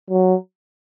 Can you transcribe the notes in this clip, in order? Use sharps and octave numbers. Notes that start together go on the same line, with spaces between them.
F#3